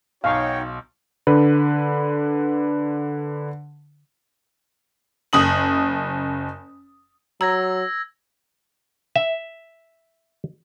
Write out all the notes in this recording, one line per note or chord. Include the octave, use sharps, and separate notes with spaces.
B1 D#4 F#4 C#5 F5 G5 G#5 C#6
D3 B4
F#1 D#6 F#7
F#3 A#5 E6 G#6 A#6
E5